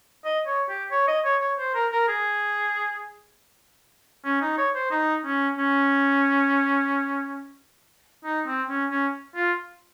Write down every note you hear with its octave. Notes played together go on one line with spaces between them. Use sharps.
D#5
C#5
G4
C#5
D#5
C#5
C#5
C5
A#4
A#4
G#4
C#4
D#4
C#5
C5
D#4
C#4
C#4
D#4
C4
C#4
C#4
F4